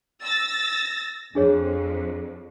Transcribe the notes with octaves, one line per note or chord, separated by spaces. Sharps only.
E6 A6 A#6
F2 D4 G#4 C#5